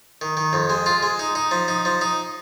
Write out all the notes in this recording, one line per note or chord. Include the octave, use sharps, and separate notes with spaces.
D#3
D#3
F2
G#3
F4
G#3
D#4
D#4
F3
D#4
F3
D#4